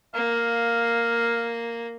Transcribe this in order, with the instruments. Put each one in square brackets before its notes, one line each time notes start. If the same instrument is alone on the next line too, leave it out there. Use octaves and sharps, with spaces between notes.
[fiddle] A#3 [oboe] F5